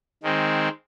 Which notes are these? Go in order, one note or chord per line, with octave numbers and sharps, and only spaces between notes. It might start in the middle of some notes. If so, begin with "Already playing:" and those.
D#3 G#3 C4